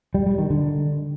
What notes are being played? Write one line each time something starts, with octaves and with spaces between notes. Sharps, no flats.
G3
G3
D#3
D3